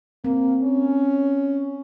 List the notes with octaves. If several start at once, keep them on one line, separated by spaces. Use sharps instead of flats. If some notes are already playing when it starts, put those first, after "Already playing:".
A#3 C4
C#4